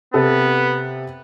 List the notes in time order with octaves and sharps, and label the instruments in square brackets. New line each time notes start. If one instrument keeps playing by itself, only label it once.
[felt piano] C3 A4 [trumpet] B3